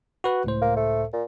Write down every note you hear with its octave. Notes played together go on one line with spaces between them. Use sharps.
F#4 B4 F#6
C#2 A2 C5
A#3
A3
A#2